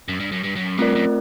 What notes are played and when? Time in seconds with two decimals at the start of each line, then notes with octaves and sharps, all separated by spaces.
0.08 F#2
0.20 G2
0.32 F#2
0.43 G2
0.55 F#2
0.79 G2 A3 C4 F4 A#4 D5
0.95 F#2